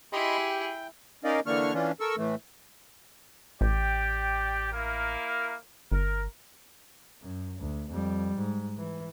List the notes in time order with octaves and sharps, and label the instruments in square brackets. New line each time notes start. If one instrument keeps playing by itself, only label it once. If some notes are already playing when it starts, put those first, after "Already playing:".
[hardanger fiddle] E4 G#4 [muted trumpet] G4 [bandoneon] D#5 B5 C6
[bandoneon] G5
[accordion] C#4 D#4 A#4 D5 D#5 F5
D3 E3 A#3 D4 C#6 F6
E3 C#4 D4 F4
A4 A#4 C#6 E6
A2 E3 A3
[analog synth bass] A1 [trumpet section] G4 D5 G5
[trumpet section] A#3 E4 A#4
[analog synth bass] G1 [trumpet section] A#4
[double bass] F#2
D2
F2 G3
G#2
E3